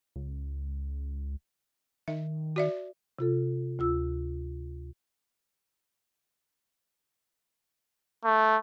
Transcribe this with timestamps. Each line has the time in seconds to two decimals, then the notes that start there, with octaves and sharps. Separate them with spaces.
0.16 C#2
2.08 D#3 E5
2.56 F#4 D5 E5
3.19 C3 F4 A4
3.79 D2 F4 E6
8.25 A3